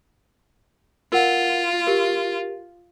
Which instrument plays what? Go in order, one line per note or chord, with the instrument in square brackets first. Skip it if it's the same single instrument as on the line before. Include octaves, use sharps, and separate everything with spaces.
[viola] F4 [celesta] A#4 F#5
[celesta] G4 A#4